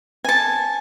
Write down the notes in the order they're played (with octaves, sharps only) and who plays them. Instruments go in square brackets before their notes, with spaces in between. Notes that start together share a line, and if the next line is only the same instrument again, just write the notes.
[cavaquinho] G#5 A5